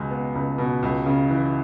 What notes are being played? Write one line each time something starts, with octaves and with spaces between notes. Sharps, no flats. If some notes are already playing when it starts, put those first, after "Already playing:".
Already playing: C#2 B2 G#3
B3
C#2
B2
C#2
C#3
E3